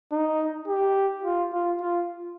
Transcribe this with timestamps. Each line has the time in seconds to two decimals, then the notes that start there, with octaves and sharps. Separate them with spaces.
0.12 D#4
0.68 G4
1.24 F4
1.53 F4
1.81 F4